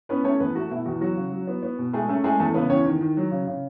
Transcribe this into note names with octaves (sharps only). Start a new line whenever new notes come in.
B3 C#4 B4
A3 C#4 C#5
E2 B3 B4
A3 F#4
B2 E4
E2 F#4
F#3 F#4
C#3
F#3
B3
B3
B2
G#3 A3 G#4
A3 C#4 A4
G#3 A3 G#4
E2 A3 A4
C#3 B3 B4
E2 C#4 C#5
D#3
D#3
F#3
C#3
C#3